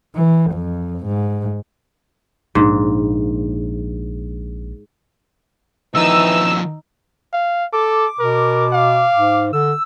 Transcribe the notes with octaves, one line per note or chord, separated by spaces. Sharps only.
E3
F2
G#2
A#1 G#2 D#3 D4
D#2 E3 F3 D#4 E6
F5
A4 D6
B2 A#4
F5
G#2
D3 E6